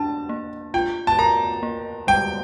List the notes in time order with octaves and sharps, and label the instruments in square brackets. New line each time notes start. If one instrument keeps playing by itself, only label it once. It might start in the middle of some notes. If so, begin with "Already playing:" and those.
Already playing: [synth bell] D4 [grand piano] A5
[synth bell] A#3
[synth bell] F4 [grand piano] G5
[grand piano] A5
[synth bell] A#4 [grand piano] A#5
[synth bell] A#3
[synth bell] G3 [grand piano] G5